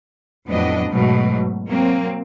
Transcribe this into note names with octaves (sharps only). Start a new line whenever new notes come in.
F2 A2 F#3 B3 D4 D#5
G#2 B2 F#3 A3
F#3 A#3 C4